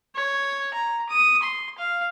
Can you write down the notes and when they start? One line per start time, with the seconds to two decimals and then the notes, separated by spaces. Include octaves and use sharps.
0.16 C#5
0.74 A#5
1.09 D#6
1.43 C6
1.78 F5